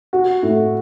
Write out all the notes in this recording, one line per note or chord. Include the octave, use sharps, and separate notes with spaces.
F#4
A2